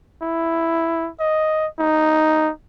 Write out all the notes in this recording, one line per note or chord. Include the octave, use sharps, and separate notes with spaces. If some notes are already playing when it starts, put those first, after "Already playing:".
E4
D#5
D#4